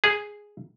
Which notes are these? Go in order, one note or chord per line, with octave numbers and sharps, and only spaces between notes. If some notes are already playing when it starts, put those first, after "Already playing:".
G#4